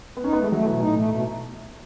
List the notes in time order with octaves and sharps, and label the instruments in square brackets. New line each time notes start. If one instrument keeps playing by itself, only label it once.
[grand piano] B3
[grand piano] C#4 [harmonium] D#4
[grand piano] B3
[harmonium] A3
[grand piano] G#3
[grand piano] F#3 [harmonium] A3
[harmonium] B2 [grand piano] E3
[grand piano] A2 [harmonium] D#4
[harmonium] A3
B2